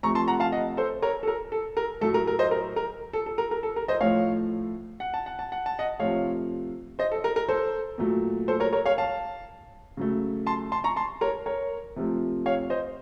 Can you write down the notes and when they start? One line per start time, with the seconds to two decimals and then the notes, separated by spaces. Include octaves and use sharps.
0.03 C3 F3 A3 A#5 C#6
0.15 A5 C6
0.28 F#5 A#5
0.40 F5 A5
0.52 D#5 F#5
0.77 A4 C5
1.02 A#4 C#5
1.23 A4
1.28 A#4
1.52 A4
1.77 A#4
2.01 A2 F#3 A3 A4
2.14 A#4
2.27 A#4
2.39 C5 D#5
2.51 A#4
2.76 A#4
3.13 A4
3.26 A4
3.38 A#4
3.51 A#4
3.63 A4
3.76 A#4
3.88 C5 D#5
4.01 A2 F3 A3 C#5 F5
5.00 F#5
5.14 A5
5.26 F#5
5.39 A5
5.52 F#5
5.66 A5
5.79 D#5 F#5
6.00 C3 F3 A3 C#5 F5
6.99 C5 D#5
7.11 A4
7.24 A#4
7.36 A#4
7.49 A4 C5
7.98 A#2 F#3 A3
8.48 A4 C5
8.60 A#4 C#5
8.73 A#4 C#5
8.86 C#5 F5
8.98 F5 A5
9.97 C#3 F#3 A3
10.47 A5 C6
10.72 A5 C6
10.84 A#5 C#6
10.96 A5 C6
11.21 A#4 C#5
11.46 A#4 C#5
11.96 C3 F3 A3
12.46 C#5 F5
12.70 C5 D#5